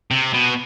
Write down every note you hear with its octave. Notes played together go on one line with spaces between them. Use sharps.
C3
B2